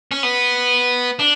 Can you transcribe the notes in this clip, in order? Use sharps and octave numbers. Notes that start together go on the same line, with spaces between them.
C#4
B3
D4